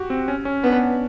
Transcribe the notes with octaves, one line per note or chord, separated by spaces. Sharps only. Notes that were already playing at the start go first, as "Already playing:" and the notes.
Already playing: F#4 G4
C4
C#4
C#4
B3 D4